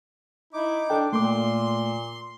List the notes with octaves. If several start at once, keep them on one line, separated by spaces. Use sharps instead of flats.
D#4 E4 D6
D4 A4 G5
A#2 A3 A#3 C6 D6